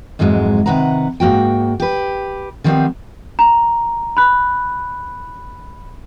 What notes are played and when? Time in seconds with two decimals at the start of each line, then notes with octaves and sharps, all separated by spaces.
0.19 F2 G#2 E3 F#3 G#3
0.66 C3 D#3 B4 F#5 A#5
1.20 G#2 A#3 F#4 G5
1.80 G4 B4
2.64 D3 D#3 F3 G3 B3 C4
3.39 A#5
4.17 B5 F#6